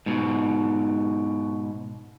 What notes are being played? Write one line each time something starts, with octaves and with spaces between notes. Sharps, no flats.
G#2 B2